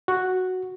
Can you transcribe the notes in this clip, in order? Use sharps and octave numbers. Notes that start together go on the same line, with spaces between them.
F#4